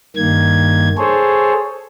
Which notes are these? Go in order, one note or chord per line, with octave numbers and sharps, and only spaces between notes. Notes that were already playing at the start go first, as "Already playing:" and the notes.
G2 D#3 A#3 G#6
G#4 A4 C5 C#5